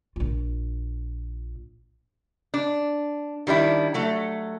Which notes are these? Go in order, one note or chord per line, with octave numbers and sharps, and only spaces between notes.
A#1 F4
D4
D#3 G3 D4 E4
F#3 A3